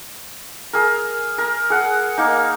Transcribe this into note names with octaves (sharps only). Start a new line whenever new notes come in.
G#4 A#4
A#4
G#4 F#5
A#3 D#4